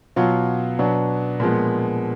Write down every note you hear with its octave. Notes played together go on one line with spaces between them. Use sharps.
B2 F#3 B3 F4
B2 F#3 B3 D4
A#2 F3 G#3 B3